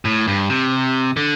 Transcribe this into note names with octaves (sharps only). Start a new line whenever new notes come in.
A2
G2
C3
D3